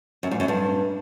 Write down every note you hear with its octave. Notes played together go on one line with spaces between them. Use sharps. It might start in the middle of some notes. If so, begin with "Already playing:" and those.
F#2
G#2
F#2
G2